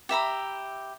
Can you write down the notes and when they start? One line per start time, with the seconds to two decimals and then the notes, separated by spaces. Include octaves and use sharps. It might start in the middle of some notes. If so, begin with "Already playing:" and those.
0.09 G4 E5 A#5 B5